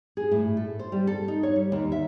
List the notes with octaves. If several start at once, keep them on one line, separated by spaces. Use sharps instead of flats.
G#4
A2
A4
C5
G3
A4
D#4
C#5
G3
D#2
E5